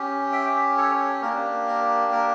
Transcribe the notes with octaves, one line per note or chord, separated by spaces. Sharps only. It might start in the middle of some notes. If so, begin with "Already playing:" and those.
Already playing: C#4 G4
E5 G5
A4 C#5
A#3 D4 G4 A#4
A#4
A#4